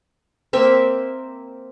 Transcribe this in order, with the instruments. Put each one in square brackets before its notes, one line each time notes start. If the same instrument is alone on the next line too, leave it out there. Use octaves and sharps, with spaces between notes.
[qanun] A#3 C4 E5